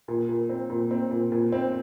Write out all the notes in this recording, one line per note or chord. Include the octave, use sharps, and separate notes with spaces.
A#2
A#2
C4
A#2
C4
A#2
A#2
C4